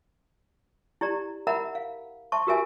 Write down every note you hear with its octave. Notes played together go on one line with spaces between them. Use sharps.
E4 G4 D5 A#5
A#4 D#5 E5 F#5 A#5 B5
F5
C5 E5 A5 C6 C#6
F#4 G4 A#4 B4 E5 G#5